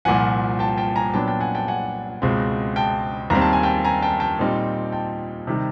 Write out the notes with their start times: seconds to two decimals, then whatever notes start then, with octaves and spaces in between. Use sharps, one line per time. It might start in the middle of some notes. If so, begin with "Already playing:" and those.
0.05 C2 A#2 F3 F#5 G#5
0.59 G5 A5
0.77 G5 A5
0.96 G#5 A#5
1.13 A#2 F#3 B3 D4 G5 A5
1.27 G5 A5
1.40 F#5 G#5
1.55 G5 A5
1.68 F#5 G#5
2.22 C#2 B2 G#3 C4
2.76 G5 A5
3.30 D#2 D#3 G3 C4 A#5
3.41 A5
3.53 G#5
3.63 G5 A5
3.85 G#5 A#5
4.02 G5 A5
4.20 G5 A5
4.39 A#2 G3 C4 D#4
4.92 G5 A5
5.47 C3 D#3 G3